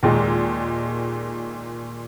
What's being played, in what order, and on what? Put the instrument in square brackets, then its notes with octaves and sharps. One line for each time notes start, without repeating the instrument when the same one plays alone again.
[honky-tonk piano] D#2 A#2 G#3